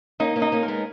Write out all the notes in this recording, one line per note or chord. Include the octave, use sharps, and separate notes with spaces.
A#3 C#4 D#4
A#3 C#4
D#4
A#3 C#4
A#4
G#3 B3